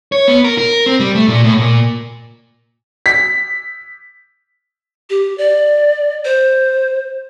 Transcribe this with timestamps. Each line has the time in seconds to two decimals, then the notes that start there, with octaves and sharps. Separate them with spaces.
0.12 C#5
0.28 B3
0.44 A#4
0.58 A#4
0.86 C4
1.00 G3
1.15 A3
1.28 A#2
1.44 A2
1.59 A#2
3.06 B6
5.10 G4
5.38 D5
6.25 C5